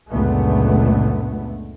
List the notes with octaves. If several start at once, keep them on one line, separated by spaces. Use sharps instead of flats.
C#2 F#2 A#2 D3 A3 B3